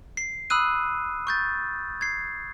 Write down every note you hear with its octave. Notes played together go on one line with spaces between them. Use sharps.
C7
B5 D#6 E6 F#6 D#7
C#6 G6 A6
G#6 C7